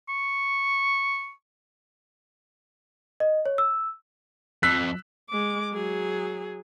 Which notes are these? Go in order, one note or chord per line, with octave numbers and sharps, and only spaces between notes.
C#6
D#5
C#5
E6
F2 E6 F#6 B6
G#3 D6
F#3 G#4